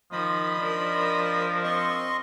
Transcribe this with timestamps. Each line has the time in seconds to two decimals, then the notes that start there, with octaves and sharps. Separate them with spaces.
0.12 D#3 F3 D#5 B5 D#6
0.60 D4 A#4
1.64 C4 D#5 C6 C#6